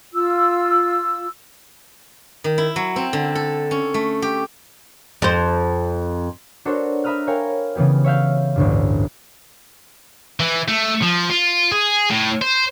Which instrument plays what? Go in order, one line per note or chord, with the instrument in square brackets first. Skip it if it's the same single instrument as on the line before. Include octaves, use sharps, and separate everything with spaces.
[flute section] F4 E6
[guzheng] D#3
E4
F#3
C4
D3
A4
C#4
A3
G4
[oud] F2 C5
[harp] D4 F#4 A4 A#4 C5 C#5
E5 A#5 B5 D#6 F6 F#6
A#4 C#5 F5 G5 G#5
C#3 E3 B3 G4 G#4
C#5 E5 F5 G6
A1 D2 G2
[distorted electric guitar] E3
A3
F3
F4
G#4
A2
C5